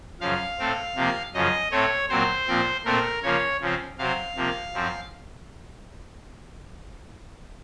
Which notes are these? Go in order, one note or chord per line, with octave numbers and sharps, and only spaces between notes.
F#2 C#3 F3 F5
A2 A3 C4
C3 F3 A#3
F#2 C#3 F3 D#5
A2 A3 C4 C#5
A#2 F#3 C4 C5
A#2 F3 C4
A#2 A3 C4 A#4
C#3 F3 A#3 C#5
C#3 F3 C4
C3 F#3 C4 F5
C3 F3 A#3
F#2 F3 C4